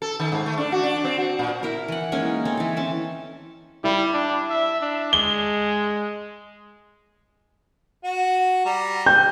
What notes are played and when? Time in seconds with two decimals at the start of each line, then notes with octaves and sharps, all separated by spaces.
0.02 A4
0.20 D#3
0.32 G#2
0.46 A3
0.58 D4
0.72 F#4
0.83 D4
1.04 C4
1.18 F#4
1.39 A#2
1.63 E4 A#4
1.88 E3 F#5
2.12 G#3 A#3 C#4 D#4
2.45 C4 A4 C#5
2.57 E3 A4
2.77 C#4 A5
3.84 G3 E4
4.13 D4
4.50 E5
4.81 D4
5.13 G#3 G7
8.04 F#4
8.65 G3 A#5
9.06 G5 G6